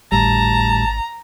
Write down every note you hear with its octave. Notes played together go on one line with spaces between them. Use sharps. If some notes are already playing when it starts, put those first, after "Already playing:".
G#1 D2 A2 G3 A5 A#5